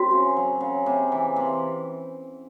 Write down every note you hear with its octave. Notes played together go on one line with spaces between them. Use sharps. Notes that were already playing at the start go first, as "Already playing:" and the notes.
Already playing: F#2 C4 F#4
C#3
F#3
C#3
C3
E3
C3